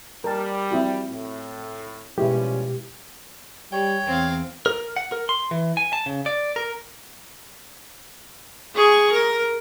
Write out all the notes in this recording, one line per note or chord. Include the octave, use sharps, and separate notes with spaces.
G3 A#4 A5
C4 E4 F#4
A2
B2 F3 G3 G#3 C#4 E4 G4 B4
G3 C#5 G5
E2 C4 F5
A#4
F#5
A#4
C6
E3
G#5
A5
C#3
D5
A#4
G#4 C#6
A#4